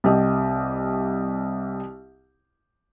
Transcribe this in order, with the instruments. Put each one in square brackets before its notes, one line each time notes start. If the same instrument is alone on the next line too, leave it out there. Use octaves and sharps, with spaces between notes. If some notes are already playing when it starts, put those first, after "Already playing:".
[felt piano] C2 G4 D#5